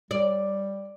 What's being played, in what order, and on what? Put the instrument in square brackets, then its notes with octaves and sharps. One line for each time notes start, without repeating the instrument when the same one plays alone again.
[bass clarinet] G3 [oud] D5